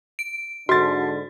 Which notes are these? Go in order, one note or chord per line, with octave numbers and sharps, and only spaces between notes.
D7
G#2 D3 F#4 C6 A6